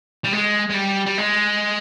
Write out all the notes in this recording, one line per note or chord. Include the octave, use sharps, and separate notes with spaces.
G3
G#3
G#3
G3
G3
G#3